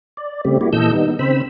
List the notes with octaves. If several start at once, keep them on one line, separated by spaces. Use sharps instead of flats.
D5
C#3 G3 A3 C4 G4
G3 A#3 E4 F#4 G4
A#2 E3 A4 D#5 E6 G6
D#3 G3 B3 D#4
C#3 C4 C5 B5 E6